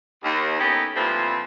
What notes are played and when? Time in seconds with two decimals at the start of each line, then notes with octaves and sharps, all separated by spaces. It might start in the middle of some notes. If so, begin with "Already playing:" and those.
0.23 D#2
0.59 B3 C#4 D#4 E4 G4 A4
0.96 A#2 E3 F3 G3 A3 C4